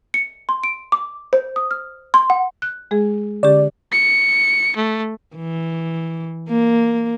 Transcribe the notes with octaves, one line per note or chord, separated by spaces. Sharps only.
C#7
C6
D7
D6
C5
D#6
F6
C6
F#5
F#6
G#3 G#4
D3 C#4 G4 D5
C#7
A3
E3
A#3